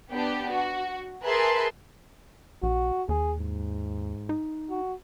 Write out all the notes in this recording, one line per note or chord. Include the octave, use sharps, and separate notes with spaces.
B3 D4 G4
F#4
G#4 A#4 B4 E5 A5 C6
A#1 F#4
D#2 G#4
G#2
D#4
F#4